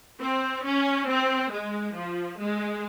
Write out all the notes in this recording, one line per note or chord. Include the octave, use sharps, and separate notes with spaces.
C4
C#4
C4
G#3
F3
G#3